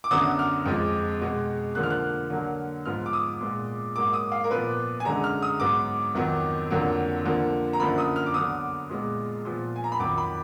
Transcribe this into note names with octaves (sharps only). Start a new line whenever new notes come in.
D6
F#2 D3 F#3 B3 D#6
F6
F2 F3 G#3
B2 G#3 B3
D3 F3 A#3 F#6
F6
F#6
D3 F#3 A#3
G#2 F3 B3 F6
D6
D#6
A#2 G#3 B3
G#2 F#3 A#3 D6
D#6
F5
A#4
A#2 F3 B3 B4
G#5
F#2 D3 G#3 A#5
F6
D#6
G#2 F#3 B3 D6
F2 D#3 F#3 B3
F2 D3 F#3 A#3
D3 F3 A#3
A#5
F#2 D3 F3 A#3 B5
D#6
F6
D6
D3 F#3 B3 D#6
A#2 G#3 B3
A#2 F3 B3
G#5
A#5
B5
F2 D#3 F#3 D6
B5